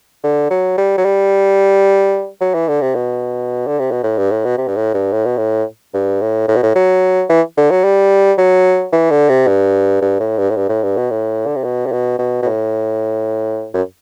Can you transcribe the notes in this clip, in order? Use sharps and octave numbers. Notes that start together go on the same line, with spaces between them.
D3
F#3
G3
F#3
G3
F#3
E3
D3
C3
B2
D3
C3
B2
A2
G2
A2
B2
C3
G2
A2
G2
A2
B2
A2
G2
A2
A2
B2
A2
F#3
E3
D3
F#3
G3
F#3
E3
D3
C3
G2
G2
A2
G2
A2
G2
A2
G2
B2
A2
D3
C3
B2
C3
B2
B2
B2
A2
F#2